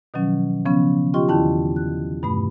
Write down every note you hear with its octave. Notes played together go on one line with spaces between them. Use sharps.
B2 D#3 F3 F#3 C#4
C#3 F3 B3 C#4
F4 G4 D#5 G5 C6 C#6
E2 D3 D#3 E4 G5 A5
F#6
G2 B2 A3 B5